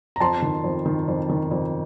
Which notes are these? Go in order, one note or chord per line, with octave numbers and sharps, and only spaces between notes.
A#5
F2 A5 C6
D#3
F2
D#3
F2
D#3
F2